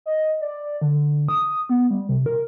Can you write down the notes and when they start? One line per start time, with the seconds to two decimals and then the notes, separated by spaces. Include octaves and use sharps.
0.06 D#5
0.41 D5
0.82 D3
1.29 D#6
1.69 B3
1.90 G3
2.09 C3
2.26 A#4